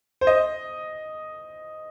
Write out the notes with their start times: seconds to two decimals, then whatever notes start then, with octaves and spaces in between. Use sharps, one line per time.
0.21 C5
0.27 D#5